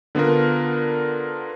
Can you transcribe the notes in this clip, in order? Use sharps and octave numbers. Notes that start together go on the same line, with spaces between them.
D3 B3 D4 F4 A#4